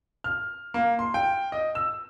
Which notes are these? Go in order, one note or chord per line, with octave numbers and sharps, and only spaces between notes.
F6
A#3
C6
G5
D#5
E6